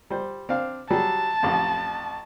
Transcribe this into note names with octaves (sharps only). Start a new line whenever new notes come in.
G3 C5
C4 D4 F5
F#3 G3 G#4 A5
A1 F2